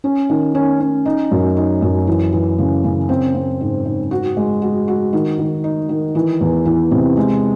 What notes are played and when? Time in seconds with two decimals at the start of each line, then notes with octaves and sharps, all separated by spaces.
0.04 C#4
0.29 D#3
0.55 C#4
0.80 C#4
1.05 D#4
1.31 F#2
1.57 D#4
1.82 F#2
2.07 E3
2.32 E3
2.58 C#3
2.84 C#3
3.09 C4
3.35 C4
3.61 G#2
3.85 G#2
4.11 F#4
4.37 G#3
4.62 F#4
4.88 F#4
5.13 D#3
5.39 D#3
5.64 D#4
5.89 D#3
6.15 E3
6.41 E2
6.66 E3
6.91 C3
7.17 G#3